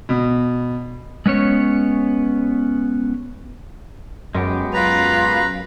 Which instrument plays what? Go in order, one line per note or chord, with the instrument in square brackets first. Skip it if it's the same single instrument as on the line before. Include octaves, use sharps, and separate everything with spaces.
[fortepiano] B2
[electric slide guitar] G#3 B3 C#4 C#5
[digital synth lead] F#2 [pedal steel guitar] G#3 B3 G4
[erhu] F4 [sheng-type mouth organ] B4 A#5